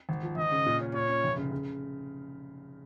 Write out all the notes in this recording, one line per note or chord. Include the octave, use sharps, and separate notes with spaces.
G#1
F3
G#1 D#5
C#3
A#2
C#4
A#2 C#5
C#4
F1
C#3
C#3